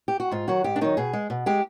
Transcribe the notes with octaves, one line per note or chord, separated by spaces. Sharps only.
G4
F#4
G#2 F4
D#3 F#3 F#4
G#2 G4
D4
D#3 F#3 D#4
B2 G#4
G#3
B2
G#3 G4